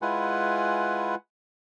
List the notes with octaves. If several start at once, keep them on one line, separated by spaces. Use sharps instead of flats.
G#3 E4 F4 B4 F#5 G#5